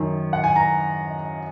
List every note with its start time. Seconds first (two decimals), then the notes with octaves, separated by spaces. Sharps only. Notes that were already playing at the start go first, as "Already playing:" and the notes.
Already playing: F#2 D#3
0.33 F#5
0.44 G#5
0.56 A#5